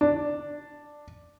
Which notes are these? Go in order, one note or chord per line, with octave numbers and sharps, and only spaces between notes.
D4